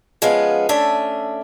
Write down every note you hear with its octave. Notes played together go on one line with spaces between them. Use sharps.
F3 G#3 B3 C#4 F5
A3 C#4 D4 E5